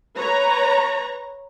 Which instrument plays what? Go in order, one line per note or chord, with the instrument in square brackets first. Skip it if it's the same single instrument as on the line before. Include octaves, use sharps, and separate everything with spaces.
[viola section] B4 C#5 A#5